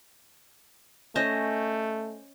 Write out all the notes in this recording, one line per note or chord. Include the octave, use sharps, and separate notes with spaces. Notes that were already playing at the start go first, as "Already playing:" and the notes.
A3 C#4 C5 D#5